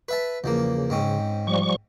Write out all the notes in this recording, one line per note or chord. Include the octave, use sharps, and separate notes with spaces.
B4 E5 A5
E2 C#3 F3 A#3
G#2 C4 C#4
F3 G3 C#6